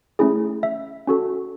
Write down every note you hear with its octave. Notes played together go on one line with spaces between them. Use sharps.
A3 C#4 E4 G#4
E5
C#4 F#4 A4